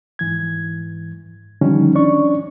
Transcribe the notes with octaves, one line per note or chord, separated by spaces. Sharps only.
G#2 E3 G#6
D3 D#3 F3 G3 C#4 D#4
C#4 D4 D5 C#6